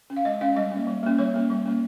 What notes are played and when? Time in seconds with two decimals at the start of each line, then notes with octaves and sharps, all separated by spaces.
0.10 C#4
0.16 F5
0.25 G#3 D#5
0.41 C#4 F5
0.56 G3 D#5
0.72 A#3 C#4
0.87 G3
1.03 A#3 C#4
1.19 G3 C#5
1.34 A#3 C#4
1.50 G3
1.65 A#3 C#4